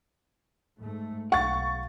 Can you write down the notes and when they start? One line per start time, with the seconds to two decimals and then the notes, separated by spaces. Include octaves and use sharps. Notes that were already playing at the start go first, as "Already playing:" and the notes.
0.78 G#2 A3
1.32 B1 F5 F#5 C#6 A6